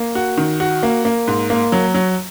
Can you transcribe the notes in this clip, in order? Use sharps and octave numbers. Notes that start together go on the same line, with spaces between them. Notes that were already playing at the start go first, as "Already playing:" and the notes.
Already playing: A#3
F#4
D#3
F#4
A#3
A#3
G#2
A#3
F#3
F#3